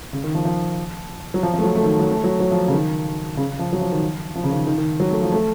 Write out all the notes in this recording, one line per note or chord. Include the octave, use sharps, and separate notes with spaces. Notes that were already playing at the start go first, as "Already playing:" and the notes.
C#3
D#3
F3
F3
F#3
F3
F3
A3
F#3
A3
D#3
F#3
A3
F#3
F#3
F3
C#3
D#3
C#3
F3
F#3
F3
D#3
F3
C#3
D#3
D#3
D#3
F#3
A3
F3
A3